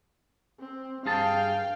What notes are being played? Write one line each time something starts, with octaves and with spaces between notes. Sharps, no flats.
C4
G2 G#4 F5 G5 A5